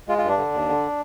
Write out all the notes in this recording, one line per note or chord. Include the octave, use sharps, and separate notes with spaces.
G#3 F4
G2 F4
D4
D3
D#2
D3